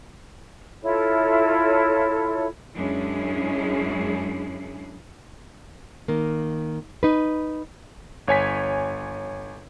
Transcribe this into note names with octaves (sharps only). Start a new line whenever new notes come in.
E4 F4 A4 C#5
F#2 G#3 C#4 D4 E4 G#4
D#3 A#3
D#4 B4
G1 C#5 G#5 B6